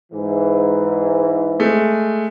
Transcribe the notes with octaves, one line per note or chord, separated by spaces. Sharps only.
G#2 E3
G#3 A3